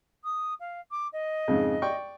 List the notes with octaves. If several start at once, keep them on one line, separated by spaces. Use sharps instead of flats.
D#6
F5
D6
D#5
F2 G#2 C#3
D5 G5 C#6